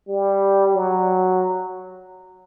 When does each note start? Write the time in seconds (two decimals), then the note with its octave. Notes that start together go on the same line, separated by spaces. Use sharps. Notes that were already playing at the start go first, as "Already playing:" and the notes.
0.09 G3
0.75 F#3